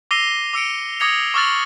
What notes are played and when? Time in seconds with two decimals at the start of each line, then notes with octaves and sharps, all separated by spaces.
0.11 D6 E6 A#6 C7 D#7 G7
0.53 D6 E6 C#7 D7
1.00 D6 D#6 G#6 A#6 C#7 F7
1.34 C#6 D6 E6 F6 A6 F#7